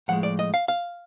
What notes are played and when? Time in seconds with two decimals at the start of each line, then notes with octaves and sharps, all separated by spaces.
0.08 A2 F3 G#3 F#5
0.23 D5
0.39 D#5
0.54 F5
0.68 F5